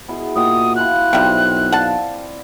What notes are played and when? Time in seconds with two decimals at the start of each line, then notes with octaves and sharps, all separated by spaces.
0.08 B2 E4 G#4
0.36 A#2 F#4 D#5 G5 D#6
0.76 E4 F4 G#5 F#6
1.13 B1 C3 G3 C4 E5
1.72 D5 F5 F#5 A5